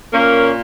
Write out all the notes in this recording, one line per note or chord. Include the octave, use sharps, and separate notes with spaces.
A#2 A#3 C#4